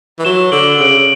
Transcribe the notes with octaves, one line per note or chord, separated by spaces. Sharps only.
E3
F#3 E7 G7
D3 D7 F#7
C#3 D7 F#7